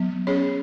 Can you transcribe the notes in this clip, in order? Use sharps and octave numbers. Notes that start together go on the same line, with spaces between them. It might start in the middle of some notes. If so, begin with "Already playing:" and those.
Already playing: F#3 B3
C#4 G#4 C#5